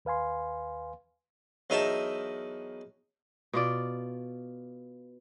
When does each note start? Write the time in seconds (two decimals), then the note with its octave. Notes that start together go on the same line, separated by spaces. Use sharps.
0.05 D#2 B4 F5 G#5 C6
1.70 E2 F#3 D#4 A#4 E5 A5
3.53 B2 F4 D5